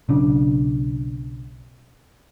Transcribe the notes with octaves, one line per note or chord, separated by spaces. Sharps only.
B1 C#3 D4